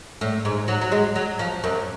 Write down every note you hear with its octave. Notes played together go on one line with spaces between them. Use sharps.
A2
G#2
F#3
F#3
G#3
F#3
F3
F#2